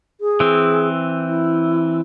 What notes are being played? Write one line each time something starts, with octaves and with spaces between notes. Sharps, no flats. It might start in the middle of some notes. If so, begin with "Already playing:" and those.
G#4
E3 C4
E4